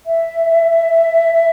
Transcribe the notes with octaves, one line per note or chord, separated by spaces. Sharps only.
E5